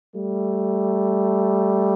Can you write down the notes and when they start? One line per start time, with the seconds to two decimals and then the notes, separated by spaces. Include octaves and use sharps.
0.15 G3 A3